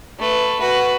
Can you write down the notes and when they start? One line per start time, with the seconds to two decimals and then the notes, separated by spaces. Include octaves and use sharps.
0.19 A3 B4
0.59 F#4 B4